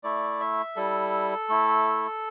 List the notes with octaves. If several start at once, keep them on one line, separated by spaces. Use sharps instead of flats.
A3 E4 D5
E5
G3 E4 A4
A3 E4